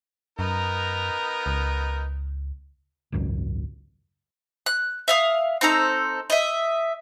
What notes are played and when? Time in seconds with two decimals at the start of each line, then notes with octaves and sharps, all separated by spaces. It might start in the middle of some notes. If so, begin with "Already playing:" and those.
0.39 F#2 B3 D#4 A#4
1.46 C#2
3.12 G#1 C#2 F#2
4.66 F#6
5.08 E5 F5 D#6
5.61 C4 D#4 A4 A#5
6.30 D#5 E5